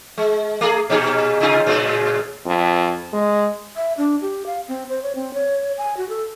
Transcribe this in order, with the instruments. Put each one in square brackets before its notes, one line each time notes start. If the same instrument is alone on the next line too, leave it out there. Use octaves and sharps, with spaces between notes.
[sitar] G#3
A3 G#4
A#2 D#4 G#4
C3 D#4 F4
A2 C#3 G#3
[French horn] F2
G#3
[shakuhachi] E5
D4
G4
F5
C4
C5
C#5
C4
C#5
G#5
F#4
A4